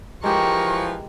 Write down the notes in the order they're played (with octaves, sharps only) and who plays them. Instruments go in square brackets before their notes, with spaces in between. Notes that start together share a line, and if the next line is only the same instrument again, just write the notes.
[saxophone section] E3 F3 [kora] G#3 G4 [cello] A#4 [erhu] C#6